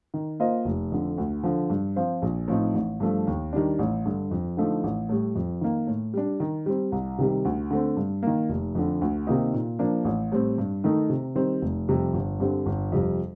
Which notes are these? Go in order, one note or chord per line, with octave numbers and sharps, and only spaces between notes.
D#3
A#3 F4 C5 D#5
F1
F2 D3
D2
D3 F3
G2
F3 C4 F4 C5
A#1
A2 F3 C4 D#4
A1
G2 F3 A3
D#2
D#3 G3 D4
A1
G2 D3
F2
D3 F3 A3 D#4
A1
A2 G3
F2
D#3 A#3
A2
G3 D4
D#3
G3 C4
C2
C3 D#3 G3
D2
D3 A3 C4
G2
D#3 A#3
F1
F2 D3
D2
C3 D#3 A#3 D#4
A#2
F3 A#3 D4
A1
A2 G3 C4
G2
D#3 A3 D#4
C3
D#3 G3 C4
F1
F2 C3 G3
G1
G2 D3 G3 C4
G1
F2 C3 G3